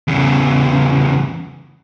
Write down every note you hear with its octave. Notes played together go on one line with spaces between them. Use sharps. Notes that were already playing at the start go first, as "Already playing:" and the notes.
E2 C#3